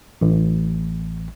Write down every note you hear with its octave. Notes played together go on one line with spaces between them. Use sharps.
A1